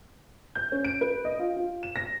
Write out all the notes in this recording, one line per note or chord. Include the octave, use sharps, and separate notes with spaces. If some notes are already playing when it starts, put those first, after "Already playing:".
G6
C#4
D7
B4
D#5
F4
F4
E7
A#6